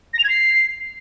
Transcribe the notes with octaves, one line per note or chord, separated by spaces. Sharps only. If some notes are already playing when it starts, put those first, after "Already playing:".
A#6
F7
G#6
C7